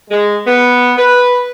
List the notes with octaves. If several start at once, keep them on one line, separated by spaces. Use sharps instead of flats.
G#3
B3
B4